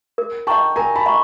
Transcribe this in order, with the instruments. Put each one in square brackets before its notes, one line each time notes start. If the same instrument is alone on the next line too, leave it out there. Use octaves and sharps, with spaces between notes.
[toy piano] A#4
[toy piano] D#5 F#5 A#5 C#6 [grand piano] G5 A5
[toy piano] A#4 [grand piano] G#5 A#5
[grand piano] A5 B5
[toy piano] D#5 F#5 A#5 C#6